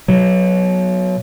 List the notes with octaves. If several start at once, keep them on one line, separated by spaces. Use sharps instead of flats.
B2 F#3